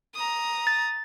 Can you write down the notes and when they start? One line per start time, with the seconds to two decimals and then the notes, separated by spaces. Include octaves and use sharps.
0.15 A#5 D#6
0.67 A6